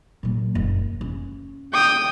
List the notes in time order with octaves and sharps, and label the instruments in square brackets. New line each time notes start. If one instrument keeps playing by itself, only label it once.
[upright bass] A#2 F#3
F#1
C#3
[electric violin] G5 D#6